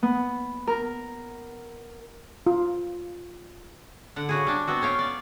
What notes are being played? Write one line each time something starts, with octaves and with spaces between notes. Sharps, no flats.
B3
A#4
F4
D3 F#5
C#3 F#4 G#4
G3 D4
B3 C4 F#4
C#4 C#5 F5 G5
D5